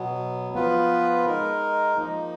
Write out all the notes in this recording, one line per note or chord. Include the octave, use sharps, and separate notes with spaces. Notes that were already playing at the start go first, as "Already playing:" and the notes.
Already playing: B2 F#3 B3
F3 B3 F4 B4
G#3 D#4 A#4
F3 A#3 D#4